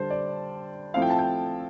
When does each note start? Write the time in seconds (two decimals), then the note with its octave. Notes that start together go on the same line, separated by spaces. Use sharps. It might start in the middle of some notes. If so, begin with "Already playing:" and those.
Already playing: D3 G3 D4 C5 A5
0.10 D5
0.94 F3 A3 C4 E4 F5
1.02 G5
1.10 A5
1.19 G5